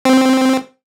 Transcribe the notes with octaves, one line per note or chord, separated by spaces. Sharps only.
C4